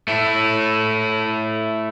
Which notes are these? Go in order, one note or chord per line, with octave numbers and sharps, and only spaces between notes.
A3 E4